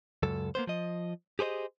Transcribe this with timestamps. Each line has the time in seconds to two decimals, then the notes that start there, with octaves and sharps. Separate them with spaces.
0.23 C#2 F#2 A4
0.55 A#3 B3 C5
0.67 F3 D#5
1.39 G4 G#4 C5 C#5 D#5